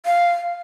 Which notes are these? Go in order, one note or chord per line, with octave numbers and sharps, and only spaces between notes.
F5